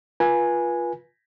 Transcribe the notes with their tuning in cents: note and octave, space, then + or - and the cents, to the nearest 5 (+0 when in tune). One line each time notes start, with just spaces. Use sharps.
F4 +0 B4 -30 G#5 +0